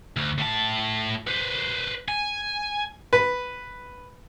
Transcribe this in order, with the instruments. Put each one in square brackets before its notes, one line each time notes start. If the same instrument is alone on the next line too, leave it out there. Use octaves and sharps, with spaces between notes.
[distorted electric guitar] D2
A2 A5
B4 C5
G#5
[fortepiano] B4